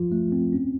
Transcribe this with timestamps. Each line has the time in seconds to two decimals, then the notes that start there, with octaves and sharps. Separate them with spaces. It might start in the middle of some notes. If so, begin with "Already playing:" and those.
Already playing: F3 F4
0.12 A3
0.32 C4
0.53 C#4